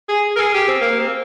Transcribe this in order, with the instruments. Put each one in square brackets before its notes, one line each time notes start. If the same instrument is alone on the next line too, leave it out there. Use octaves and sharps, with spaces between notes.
[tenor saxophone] G#4
A#4
G#4
G4
C4
A#3
C4